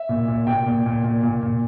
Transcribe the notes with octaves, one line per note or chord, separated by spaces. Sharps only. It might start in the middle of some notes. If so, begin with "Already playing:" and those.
Already playing: E5
A#2
A#2
A#2 G5
A#2
A#2
A#2
A#2
A#2